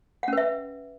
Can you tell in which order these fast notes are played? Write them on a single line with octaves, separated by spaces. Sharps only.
F#5 C#4 B4 E5